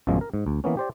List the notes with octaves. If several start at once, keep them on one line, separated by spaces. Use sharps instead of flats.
A1 F#2 B2 F3 G#3
A#4
G#2
D2
E3 A#3 B3 C#4
G4 C5 D5